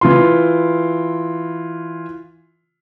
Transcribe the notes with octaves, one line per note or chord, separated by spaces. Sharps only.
E3 F4 C6